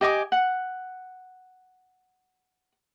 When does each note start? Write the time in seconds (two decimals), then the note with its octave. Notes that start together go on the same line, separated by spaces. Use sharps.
0.01 G4 D#5 G#5 D6
0.32 F#5